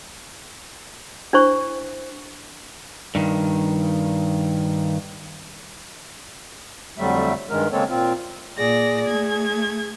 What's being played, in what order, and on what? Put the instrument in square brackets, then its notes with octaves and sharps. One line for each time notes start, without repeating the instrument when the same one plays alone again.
[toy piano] D4 E4 C5 C#6
[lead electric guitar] G2 D#3
[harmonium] F2 D3 F#3 G3 A3 E5
G2 D#3 G#3 A#4
C#3 G#3 A#3 C4 A4 C#5
A#2 C4 F4
[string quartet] A#2 D5 A#6 [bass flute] G#4
[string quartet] A3 G#6